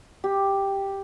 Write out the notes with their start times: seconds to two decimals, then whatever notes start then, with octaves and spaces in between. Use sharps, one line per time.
0.24 G4